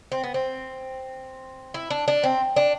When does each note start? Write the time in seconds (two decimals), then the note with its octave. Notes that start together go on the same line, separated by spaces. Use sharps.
0.12 C4
0.24 B3
0.34 C4
1.74 E4
1.90 D4
2.08 D4
2.24 C4
2.56 D4